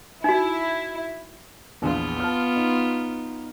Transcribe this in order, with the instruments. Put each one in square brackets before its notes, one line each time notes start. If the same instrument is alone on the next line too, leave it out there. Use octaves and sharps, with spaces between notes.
[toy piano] D#4 F#4 [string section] E4
[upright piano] A#1 E2 F3 [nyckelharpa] B3 F4
[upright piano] A5 F6
D#4